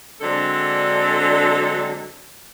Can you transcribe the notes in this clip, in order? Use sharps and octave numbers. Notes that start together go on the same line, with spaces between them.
D3 F#3 G#3 C4 D4 A4